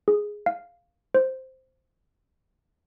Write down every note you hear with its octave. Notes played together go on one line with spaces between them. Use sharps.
G#4
F5
C5